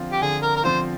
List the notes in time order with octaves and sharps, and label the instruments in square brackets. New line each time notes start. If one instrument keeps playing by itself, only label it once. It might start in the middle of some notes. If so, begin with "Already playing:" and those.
Already playing: [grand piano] D3 F3 C4 F4
[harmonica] G4
[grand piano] D3 [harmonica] G#4
[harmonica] A#4
A#4
[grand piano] F3 C4 F4 [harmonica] C5